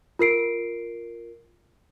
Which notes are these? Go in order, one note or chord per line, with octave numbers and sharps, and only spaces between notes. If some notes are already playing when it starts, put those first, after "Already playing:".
F4 A#4 C7 D7